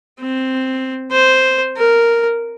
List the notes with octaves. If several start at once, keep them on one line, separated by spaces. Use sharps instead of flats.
C4
C5
A#4